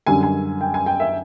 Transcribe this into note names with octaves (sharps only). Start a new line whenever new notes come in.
F#2 D3 G3 G#5
G#5
G5
G#5
G5
E5